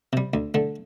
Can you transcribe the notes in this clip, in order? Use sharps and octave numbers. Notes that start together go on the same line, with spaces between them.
C3 G3
D2
D3 A3